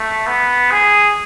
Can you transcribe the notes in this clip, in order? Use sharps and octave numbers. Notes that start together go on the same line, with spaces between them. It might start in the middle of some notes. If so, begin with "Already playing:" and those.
Already playing: A3
B3
G#4